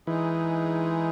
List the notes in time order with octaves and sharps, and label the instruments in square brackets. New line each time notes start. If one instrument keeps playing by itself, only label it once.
[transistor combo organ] E3 [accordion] G#3 D#4 G#4